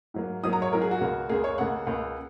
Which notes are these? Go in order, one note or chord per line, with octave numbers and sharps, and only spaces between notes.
G#2 F#3 A#3
G#2 F#3 A#3 D#6
A#5
C#5
G#2 F#3 A#3 A#4
G#4
F#4
C#2 C#3 A#3
C#2 C#3 A#3 G#4
C#5
C#2 C#3 A#3 F#5
C#2 C#3 A#3